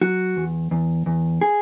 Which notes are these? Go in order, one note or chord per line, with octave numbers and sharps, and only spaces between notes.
F#3 F#4
E2
E2
E2
G#4